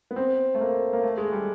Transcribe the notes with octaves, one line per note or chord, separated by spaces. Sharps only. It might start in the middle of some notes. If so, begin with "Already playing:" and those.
B3
C4
A3
A#3
A#3
A3
G#3
G3